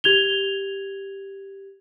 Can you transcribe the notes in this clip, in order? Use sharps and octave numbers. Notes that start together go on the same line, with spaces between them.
G4 G#6 F7 G7